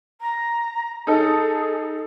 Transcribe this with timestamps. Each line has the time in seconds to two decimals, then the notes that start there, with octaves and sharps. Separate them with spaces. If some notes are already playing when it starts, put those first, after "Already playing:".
0.21 A#5
1.07 D#4 G#4 A4